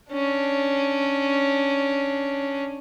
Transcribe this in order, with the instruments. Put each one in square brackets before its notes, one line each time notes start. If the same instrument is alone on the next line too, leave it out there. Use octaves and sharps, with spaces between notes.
[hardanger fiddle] C#4 D4